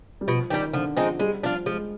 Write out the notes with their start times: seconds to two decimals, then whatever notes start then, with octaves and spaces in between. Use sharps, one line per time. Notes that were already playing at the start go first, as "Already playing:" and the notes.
0.21 G3
0.27 B2 F3
0.50 D#3 G3 D4 G4
0.73 D3 F3
0.97 F3 G#3 C4 D#4
1.19 G3 G#3
1.43 F3 D4 F4
1.66 F3 G#3